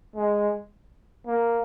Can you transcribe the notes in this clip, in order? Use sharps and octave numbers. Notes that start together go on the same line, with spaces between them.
G#3
A#3